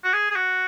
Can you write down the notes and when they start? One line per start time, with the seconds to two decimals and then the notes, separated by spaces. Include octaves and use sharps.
0.04 F#4
0.14 G#4
0.31 G#4
0.36 F#4